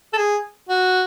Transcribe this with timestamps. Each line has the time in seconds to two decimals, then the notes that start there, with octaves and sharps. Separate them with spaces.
0.13 A4
0.18 G#4
0.69 F#4